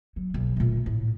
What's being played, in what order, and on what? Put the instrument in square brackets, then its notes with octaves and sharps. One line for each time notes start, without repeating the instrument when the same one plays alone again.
[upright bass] F#3
B1
A#2 A3
A2